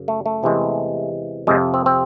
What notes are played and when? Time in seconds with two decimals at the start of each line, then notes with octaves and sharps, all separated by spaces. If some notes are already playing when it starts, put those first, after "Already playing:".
Already playing: F#2 C#3
0.08 A3
0.26 A3
0.43 E2 C3 E3 G#3
1.47 F2 C3 F3 G#3
1.74 C4
1.86 C4